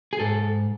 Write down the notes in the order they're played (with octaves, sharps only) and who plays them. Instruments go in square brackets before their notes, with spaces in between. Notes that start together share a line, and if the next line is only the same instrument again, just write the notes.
[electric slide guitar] G#4
G#2 A4